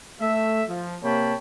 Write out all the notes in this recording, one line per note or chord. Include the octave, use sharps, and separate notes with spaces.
A3 E5
F3
C3 A#3 C#5 G5 A5 B5